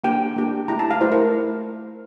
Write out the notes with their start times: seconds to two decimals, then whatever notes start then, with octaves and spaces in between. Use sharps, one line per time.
0.04 A#3 D4 G4 G5
0.36 A#3 D4 G4
0.68 A3 E4 G4 A#5
0.79 A5
0.91 F5
1.01 A3 E4 G4 C5
1.12 A#4